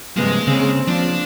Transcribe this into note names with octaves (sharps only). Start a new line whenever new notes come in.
G2 C3 F3 G#3 A#3 B4
C#3 C4
F3 D4 D5